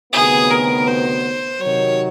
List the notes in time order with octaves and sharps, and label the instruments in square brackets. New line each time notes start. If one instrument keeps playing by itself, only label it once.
[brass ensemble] D2 C3 D#3 F#3 B3 [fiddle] G#4
[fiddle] A#4
C5
[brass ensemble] C3 D#3 F#3 [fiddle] C#5